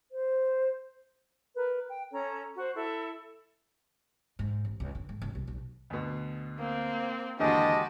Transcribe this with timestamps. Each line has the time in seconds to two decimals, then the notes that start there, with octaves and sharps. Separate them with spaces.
0.11 C5
1.54 A#4 B4
1.87 G5
2.12 C#4 A4 C#5 A#5
2.57 F#4 C5
2.75 E4 A4
4.39 G#2
4.65 A1
4.80 C#2
4.95 D3
5.09 G#2
5.22 C#2
5.35 C2
5.47 B1
5.90 D2 B2
6.58 A#3 C4
7.39 D#2 D3 E3 G#3 F#4 G4 D#5 A5